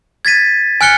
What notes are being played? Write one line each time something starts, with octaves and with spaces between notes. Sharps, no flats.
G#6 A6 B6 D#7
G#5 F6 F#6 C#7 G7